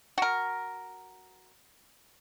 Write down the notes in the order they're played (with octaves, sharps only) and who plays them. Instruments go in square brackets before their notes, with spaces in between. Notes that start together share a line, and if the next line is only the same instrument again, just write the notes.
[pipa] F#4 A#4